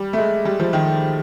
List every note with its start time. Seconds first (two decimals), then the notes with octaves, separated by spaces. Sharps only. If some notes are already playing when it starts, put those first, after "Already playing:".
Already playing: G3
0.13 A3
0.18 G#3
0.45 G3
0.60 F3
0.73 D#3